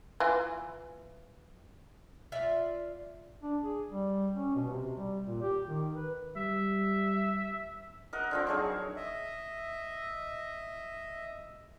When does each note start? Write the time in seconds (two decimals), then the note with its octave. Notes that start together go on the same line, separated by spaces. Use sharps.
0.20 E3 E4 F4
2.32 F4 D5 E5
3.43 D4
3.63 G#4
3.91 G3
4.35 C#4
4.55 B2
4.69 C3
4.97 G3
5.27 A#2
5.42 G4
5.68 D#3
5.96 B4
6.36 G3 E5
8.13 A#4 D#5 F#5
8.31 D3 F3 C4
8.47 F#3 D#4 G#4 C#5
8.96 D#5 E5